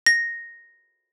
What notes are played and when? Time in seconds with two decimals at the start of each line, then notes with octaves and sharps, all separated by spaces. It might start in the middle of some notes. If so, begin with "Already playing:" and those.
0.06 A#6